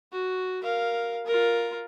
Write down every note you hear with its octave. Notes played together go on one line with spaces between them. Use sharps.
F#4
A#4 F5
F4 A#4